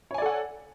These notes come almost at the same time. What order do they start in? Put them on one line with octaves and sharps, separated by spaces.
C#5 G#5 D5 A4 F#5